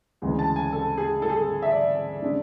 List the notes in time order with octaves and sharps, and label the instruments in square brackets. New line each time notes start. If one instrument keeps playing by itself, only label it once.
[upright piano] D2 C#3 E3 G#3
A5
G#5
A4
G#4
A4
G#4
A4
E5
D5
C#3 G#3 D4